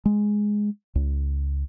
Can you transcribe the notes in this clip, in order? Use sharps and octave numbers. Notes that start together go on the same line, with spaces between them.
G#3
C#2